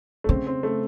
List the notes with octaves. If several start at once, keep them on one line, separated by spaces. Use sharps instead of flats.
A3
C#3 C4
C4
A3